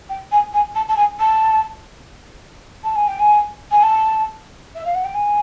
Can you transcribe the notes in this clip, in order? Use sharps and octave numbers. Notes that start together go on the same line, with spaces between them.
G5
G#5
G#5
A5
A5
G#5
A5
A5
G#5
G5
G#5
G#5
A5
E5
F5
F#5
G5
G#5